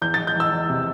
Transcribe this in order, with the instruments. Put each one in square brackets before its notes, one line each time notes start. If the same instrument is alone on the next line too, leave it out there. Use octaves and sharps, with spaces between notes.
[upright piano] E2 G6
A6
E2
G6
E2 E6
E2
C3